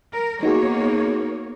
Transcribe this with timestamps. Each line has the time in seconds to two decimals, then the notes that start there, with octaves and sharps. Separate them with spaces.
0.13 A#4
0.43 A#3 B3 D#4 F#4 G#4 C#5